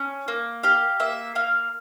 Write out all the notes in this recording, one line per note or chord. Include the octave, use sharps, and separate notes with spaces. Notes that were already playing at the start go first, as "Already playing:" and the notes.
Already playing: C#4
A#3
G4 F5
A#3 E5
A#3 F5